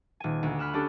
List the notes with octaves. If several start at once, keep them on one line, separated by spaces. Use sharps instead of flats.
D#1 G#5
D2
B5 F6 F#6 E7
C#4 D4 G4 A4